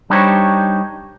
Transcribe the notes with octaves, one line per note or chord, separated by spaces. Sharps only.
G3 D4 D#4 G4 C5 C#5